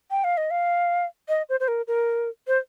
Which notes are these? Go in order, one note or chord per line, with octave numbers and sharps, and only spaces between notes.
G5
F5
D#5
F5
D#5
C5
C5
A#4
A#4
C5